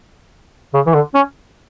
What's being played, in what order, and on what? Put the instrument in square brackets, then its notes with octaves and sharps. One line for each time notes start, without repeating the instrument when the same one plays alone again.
[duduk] C#3
E3
D3
C#4